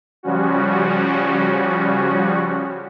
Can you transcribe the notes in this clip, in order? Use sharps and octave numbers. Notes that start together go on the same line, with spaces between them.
C#3 F3 G3 C#4 F#4